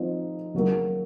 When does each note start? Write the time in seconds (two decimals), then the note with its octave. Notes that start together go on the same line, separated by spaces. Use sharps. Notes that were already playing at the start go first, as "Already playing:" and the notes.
Already playing: F3 C4 D#4
0.54 C#3 F#3 A#3